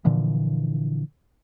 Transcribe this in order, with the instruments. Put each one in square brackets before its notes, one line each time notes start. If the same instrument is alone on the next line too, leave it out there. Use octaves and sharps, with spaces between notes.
[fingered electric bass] A#2 D3 E3 F3